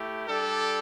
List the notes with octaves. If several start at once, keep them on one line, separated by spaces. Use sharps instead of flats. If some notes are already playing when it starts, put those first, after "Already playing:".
Already playing: A3 E4 G4
G3 D4 G4 A4